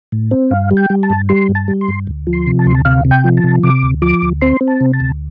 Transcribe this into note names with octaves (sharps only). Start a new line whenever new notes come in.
A2
C4
G2 F5
G3
G5
G3
A5
G2
G3 C6
G2
A5
G3
C6
G2
D2
F3
C6
C3
A5
D2 C6
A5
C3 F5
C3
G5
F3
A5
C3
C3 D6
D2
F3 D6
D2
C4 C6
C4
A5
C3
A5
D2